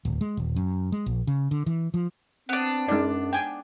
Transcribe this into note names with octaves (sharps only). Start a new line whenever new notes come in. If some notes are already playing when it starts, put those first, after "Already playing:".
D1
G#3
D#1
F#2
G#3
A#1
C#3
D3
E3
F3
B3 C4 D4
F#2 G#3 D#4 D5
G5 G#5